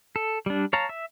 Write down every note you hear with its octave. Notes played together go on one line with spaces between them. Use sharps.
A4
G3 D4
C#5 F5 A5 A#5
E5